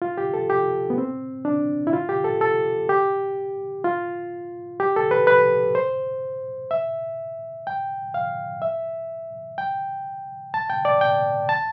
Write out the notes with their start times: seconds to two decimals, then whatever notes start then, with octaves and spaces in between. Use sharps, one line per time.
0.02 F4
0.18 G4
0.34 A4
0.50 G4
0.90 B3
0.98 C4
1.45 D4
1.87 E4
1.93 F4
2.09 G4
2.24 A4
2.41 A4
2.89 G4
3.84 F4
4.80 G4
4.96 A4
5.11 B4
5.27 B4
5.75 C5
6.71 E5
7.67 G5
8.14 F5
8.62 E5
9.58 G5
10.54 A5
10.70 G5
10.85 D5
11.01 G5
11.49 A5